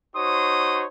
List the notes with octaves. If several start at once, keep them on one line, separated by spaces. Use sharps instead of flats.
D#4 F#4 C5 C#5 C6 D#6